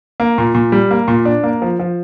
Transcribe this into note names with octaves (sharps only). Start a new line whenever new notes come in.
A#3
A#2
A#2
G3
A#3
A#2
D4
A#3
F3
F3